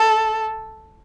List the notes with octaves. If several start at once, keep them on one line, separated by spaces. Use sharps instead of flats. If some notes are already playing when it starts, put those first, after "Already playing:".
Already playing: A4